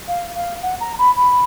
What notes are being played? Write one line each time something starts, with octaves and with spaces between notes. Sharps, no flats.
F5
F5
F#5
A#5
B5
B5